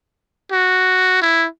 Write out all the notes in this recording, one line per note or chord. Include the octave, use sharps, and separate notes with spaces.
F#4
E4